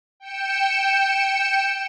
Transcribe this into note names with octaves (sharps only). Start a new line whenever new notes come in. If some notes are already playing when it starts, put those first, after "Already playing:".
G5 C#7 E7